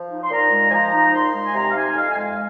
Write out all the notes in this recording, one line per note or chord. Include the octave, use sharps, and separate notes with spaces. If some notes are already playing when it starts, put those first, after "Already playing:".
Already playing: F3
D#4
C6
A#2 A#5
G#3
G#5
F3 A#5
D#4
A#2 C6
G#3
G#5
C3 A#5
F5
D#4 G#5
F2 F5
G#5
G#3 F5